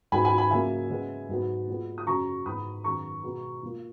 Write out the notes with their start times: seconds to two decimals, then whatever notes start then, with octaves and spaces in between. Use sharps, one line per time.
0.12 G#2 F#3 B3 G#5 B5
0.25 G#5 B5
0.38 G#5 B5
0.51 C#3 F#3 A#3 E5 G#5
0.90 C#3 G#3 B3
1.29 G#2 F#3 B3
1.68 A#2 G#3 B3
1.98 D#6
2.07 F#2 C#3 F#3 A#5 C#6
2.46 G#2 E3 B3 B5 D#6
2.84 F#2 D#3 G#3 B3 A#5 C#6
3.23 B2 G#3 B3
3.63 A#2 A#3